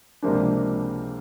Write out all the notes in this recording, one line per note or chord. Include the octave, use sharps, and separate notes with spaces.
C#2 C3 F3 A#3 D4